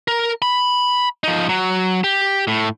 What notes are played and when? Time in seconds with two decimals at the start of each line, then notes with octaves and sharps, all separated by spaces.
0.08 A#4
0.42 B5
1.24 F3 D#4
1.49 F#3
2.04 G4
2.47 A2